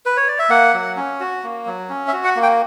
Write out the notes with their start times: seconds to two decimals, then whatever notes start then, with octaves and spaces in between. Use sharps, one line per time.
0.06 B4
0.17 C#5
0.28 D5
0.39 E5
0.49 A#3 F#5
0.74 F#3
0.97 C#4
1.20 F#4
1.44 A#3
1.66 F#3
1.89 C#4
2.08 E5
2.13 F#4
2.24 F#5
2.36 A#3
2.43 G5